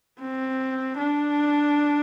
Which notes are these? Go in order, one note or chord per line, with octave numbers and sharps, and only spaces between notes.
C4
D4